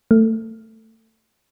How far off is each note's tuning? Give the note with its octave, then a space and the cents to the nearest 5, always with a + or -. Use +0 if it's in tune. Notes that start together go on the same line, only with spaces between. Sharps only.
A3 +20